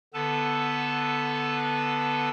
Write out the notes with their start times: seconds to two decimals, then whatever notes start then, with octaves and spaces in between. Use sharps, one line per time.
0.14 D3 B3 A4 B4 A5